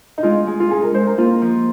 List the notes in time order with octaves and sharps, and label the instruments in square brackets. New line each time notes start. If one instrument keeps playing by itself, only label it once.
[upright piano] D#4
[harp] G#3 [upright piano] F4
[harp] G#3
[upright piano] F4
[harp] D#4 [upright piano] G#4
[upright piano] A#4
[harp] G#3 [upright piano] C5
[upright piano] A#4
[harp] A#3 [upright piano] F4
[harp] F3